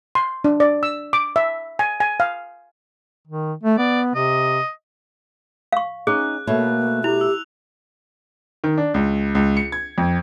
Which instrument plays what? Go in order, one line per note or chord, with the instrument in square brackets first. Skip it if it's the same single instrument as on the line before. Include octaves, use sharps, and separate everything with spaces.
[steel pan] C6
D4
D5
E6
D6
E5
G#5
G#5
F5
[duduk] D#3
A3
[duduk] B3 [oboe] D5
[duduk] C3 [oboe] D#5
[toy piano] F5 C#6
[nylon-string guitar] C#4 D#4 [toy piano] G#4 [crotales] F#6
[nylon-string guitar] B2 A3 C#5 [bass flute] A#3
[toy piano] E4 [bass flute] G4 [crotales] F7
[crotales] E6
[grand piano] D#3
D4
C#2
C#2
C#7
G#6
F2